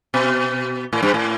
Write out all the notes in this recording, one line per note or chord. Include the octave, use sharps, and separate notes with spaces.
B2
A2
G2
A2